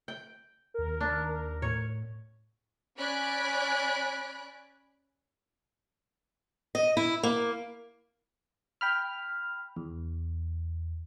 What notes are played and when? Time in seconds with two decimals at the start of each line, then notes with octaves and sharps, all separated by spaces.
0.08 G5
0.74 D#2 A#4
1.01 D4
1.62 A2 C#5
2.97 C#4 D5 G#5 B5 F#6 D7
6.75 D#5
6.97 E4
7.23 A#3
8.81 G5 B5 F6
9.77 E2